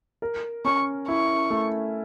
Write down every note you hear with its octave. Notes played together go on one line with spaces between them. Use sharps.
A#4
C#4 C#6
E4 C#6
A3